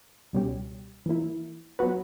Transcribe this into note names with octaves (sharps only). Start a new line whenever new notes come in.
C#2 B2 G3 C#4 G4
E3 A#3 E4
F#3 B3 F#4 B4